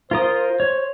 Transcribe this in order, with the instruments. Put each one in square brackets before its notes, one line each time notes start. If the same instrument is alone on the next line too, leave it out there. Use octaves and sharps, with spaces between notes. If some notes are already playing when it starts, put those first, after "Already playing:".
[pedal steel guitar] F4 A#4 D#6 [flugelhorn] C5
[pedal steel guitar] C#5